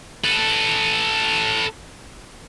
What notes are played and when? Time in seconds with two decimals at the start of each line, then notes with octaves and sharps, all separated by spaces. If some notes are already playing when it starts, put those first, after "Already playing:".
0.24 A4 B4